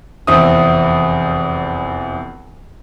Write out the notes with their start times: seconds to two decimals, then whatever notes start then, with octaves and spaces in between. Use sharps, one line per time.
0.27 F1 E2 C4 E4 D#6